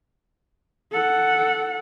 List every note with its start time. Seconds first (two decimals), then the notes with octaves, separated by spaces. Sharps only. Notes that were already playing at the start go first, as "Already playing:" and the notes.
0.92 A4 F#5